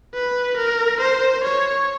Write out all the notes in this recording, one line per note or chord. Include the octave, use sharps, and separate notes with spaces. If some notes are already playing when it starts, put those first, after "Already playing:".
B4
A#4
C5
C#5